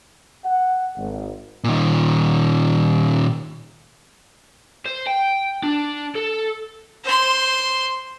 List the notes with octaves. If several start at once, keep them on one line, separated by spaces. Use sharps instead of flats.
F#5
G#1
A#2 D#3
C5
G5
D4
A4
C5 C6